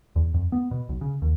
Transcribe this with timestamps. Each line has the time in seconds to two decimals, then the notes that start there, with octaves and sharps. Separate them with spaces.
0.16 E2
0.34 F2
0.52 B3
0.71 B2
0.89 B1
1.01 C#3
1.22 D#2